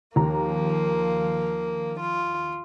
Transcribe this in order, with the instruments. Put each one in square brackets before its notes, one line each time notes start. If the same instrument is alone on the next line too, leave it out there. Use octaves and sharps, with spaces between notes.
[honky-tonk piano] D#2 A#5 [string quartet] F3 A#3
[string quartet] F4